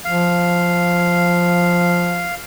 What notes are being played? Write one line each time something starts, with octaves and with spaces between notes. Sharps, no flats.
F3 F5